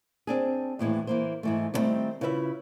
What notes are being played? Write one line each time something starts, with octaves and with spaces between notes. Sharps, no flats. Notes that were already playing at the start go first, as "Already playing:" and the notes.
C4 D4 G#4
D#2 A2 E3 G#3
E3 A#3 C5
G#2 E3 A3
D3 D#3 F3 G3 A3 C4
C#3 E4 F4 B4 C#5 E5